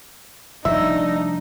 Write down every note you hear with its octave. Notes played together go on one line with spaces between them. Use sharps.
F1 F3 G3 D4 D#4 E5